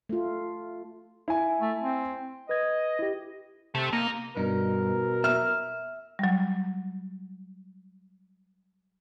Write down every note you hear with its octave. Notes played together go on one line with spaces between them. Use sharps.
A3 F4
E4 G#5
A3
C4
B4 D#5 G#6
E4 G4
C3 A3
A#3 D#4
G2 B2 D#4 A#4
E5 F6
F#3 G3